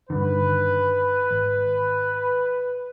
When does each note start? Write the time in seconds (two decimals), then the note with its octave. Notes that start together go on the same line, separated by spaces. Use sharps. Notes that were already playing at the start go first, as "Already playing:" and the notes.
0.10 G2 D3 D#3 B4
1.31 G#1